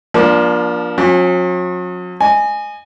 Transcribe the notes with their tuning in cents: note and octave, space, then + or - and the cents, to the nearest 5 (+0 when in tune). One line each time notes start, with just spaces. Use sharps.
F3 +0 A#3 +35 D4 +0
F#3 -45 C#4 -45 G#5 +0
D#5 -35 G#5 +0